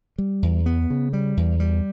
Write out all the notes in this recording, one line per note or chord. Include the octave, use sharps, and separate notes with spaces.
G3
E2
B3
C#3
G3
E2
G3